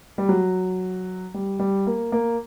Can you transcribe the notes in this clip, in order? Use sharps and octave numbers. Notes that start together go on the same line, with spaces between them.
G3
F#3
G3
G3
A#3
A#3